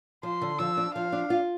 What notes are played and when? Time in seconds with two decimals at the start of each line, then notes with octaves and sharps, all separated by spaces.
0.23 F3 C6
0.41 D3
0.59 F3 E6
0.77 D4
0.95 F3 F5
1.12 D4
1.30 F4